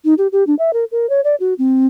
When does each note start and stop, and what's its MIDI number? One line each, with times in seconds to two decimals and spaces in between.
0.05 0.14 63
0.18 0.27 67
0.32 0.44 67
0.47 0.55 62
0.59 0.73 76
0.73 0.85 70
0.92 1.09 70
1.10 1.21 73
1.24 1.35 74
1.40 1.54 66
1.59 1.87 60